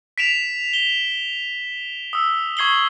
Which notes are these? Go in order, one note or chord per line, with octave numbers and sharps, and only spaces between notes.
B6 D7 E7 F7
G7
D#6 E6
C#6 G#6 C7 F#7 G7